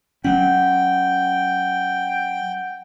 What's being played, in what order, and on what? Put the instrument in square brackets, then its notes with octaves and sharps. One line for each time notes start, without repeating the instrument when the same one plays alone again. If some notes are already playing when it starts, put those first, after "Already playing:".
[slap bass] F#3 C#4 [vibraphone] F#5 [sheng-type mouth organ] G5